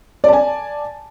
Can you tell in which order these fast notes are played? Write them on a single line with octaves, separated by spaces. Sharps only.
D5 A5 G#5